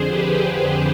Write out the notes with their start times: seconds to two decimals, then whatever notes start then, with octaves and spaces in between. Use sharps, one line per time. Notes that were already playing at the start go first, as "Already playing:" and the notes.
Already playing: F2 D3 G#4 C5
0.09 G4 B4